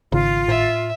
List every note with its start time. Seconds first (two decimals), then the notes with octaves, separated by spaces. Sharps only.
0.12 G#1 C#3 F4
0.48 A2 E5